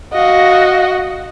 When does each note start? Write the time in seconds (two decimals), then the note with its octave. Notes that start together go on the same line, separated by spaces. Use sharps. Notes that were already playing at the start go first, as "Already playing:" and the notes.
0.14 F#4 D#5 F5